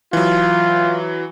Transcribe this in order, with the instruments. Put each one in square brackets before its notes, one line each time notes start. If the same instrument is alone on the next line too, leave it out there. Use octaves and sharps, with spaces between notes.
[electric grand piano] E3 F#3 [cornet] F4